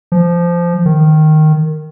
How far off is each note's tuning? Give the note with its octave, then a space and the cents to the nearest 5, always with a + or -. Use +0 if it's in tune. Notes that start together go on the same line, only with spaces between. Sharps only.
F3 -15
D#3 -10